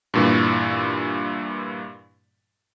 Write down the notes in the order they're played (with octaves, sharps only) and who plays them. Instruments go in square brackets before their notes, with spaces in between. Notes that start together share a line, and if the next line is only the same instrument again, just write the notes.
[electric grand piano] G2 A#2 E3